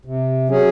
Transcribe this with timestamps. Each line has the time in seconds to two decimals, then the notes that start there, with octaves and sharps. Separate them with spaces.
0.05 C3
0.49 F#3 C#4 G#4